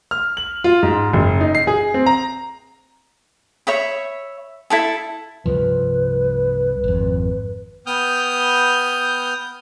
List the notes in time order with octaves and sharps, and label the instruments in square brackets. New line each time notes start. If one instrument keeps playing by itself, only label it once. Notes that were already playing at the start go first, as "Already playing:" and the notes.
[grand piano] F6
F#7
F4
G#2
F#1
D#4
C7
G#4
C4
A#5
[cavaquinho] C#5 E5 B5
E4 A4 A5
[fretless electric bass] C2 G2 F3 [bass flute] B4
[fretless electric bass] G#1 F2
[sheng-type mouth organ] B3 G5 D#6 F6 G6